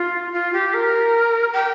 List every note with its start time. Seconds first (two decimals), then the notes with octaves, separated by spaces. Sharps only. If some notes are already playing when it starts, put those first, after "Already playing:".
Already playing: F4
0.33 F4
0.53 G4
0.74 A#4
1.53 G5